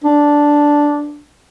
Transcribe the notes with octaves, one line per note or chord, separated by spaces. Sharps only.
D4